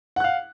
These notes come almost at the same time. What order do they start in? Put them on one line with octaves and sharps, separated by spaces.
F#5 F#6 F5